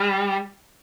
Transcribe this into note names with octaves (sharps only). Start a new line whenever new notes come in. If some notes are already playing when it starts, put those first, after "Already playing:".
Already playing: G3